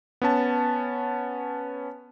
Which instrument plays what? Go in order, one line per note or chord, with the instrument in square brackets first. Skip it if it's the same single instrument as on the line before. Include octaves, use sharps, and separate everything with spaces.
[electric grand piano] B3 C#4 A5